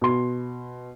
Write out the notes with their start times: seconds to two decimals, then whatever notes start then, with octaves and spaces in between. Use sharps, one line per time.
0.01 B2 C6